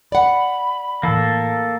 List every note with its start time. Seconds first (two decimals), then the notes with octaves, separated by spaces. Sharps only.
0.12 D5 F#5 B5
1.03 A2 E3 A#3 A4